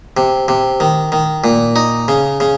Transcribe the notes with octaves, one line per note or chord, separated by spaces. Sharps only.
C3
C3
D#3
D#3
A#2
D#4
C#3
C#3